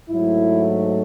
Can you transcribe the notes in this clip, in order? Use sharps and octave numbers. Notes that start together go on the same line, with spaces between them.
G#2 F#3 A3 E4